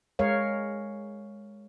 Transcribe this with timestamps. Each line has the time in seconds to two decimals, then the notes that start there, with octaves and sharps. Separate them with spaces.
0.19 G#3 A#4 C#5 F5